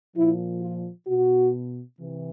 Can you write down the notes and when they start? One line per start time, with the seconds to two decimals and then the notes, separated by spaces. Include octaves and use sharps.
0.16 A#2 F3 E4
0.62 F4
1.07 B2 F#4
1.99 C3 E3